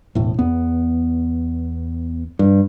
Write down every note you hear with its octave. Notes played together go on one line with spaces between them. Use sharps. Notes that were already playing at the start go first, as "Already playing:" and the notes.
E1 A2
E2 B3
G2